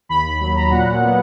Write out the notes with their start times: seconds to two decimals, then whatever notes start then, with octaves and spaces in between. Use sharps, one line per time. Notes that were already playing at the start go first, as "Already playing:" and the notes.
0.09 D#2 B5
0.24 B5
0.40 F#3 B5
0.56 A#5
0.71 A#2 F#5
1.03 B3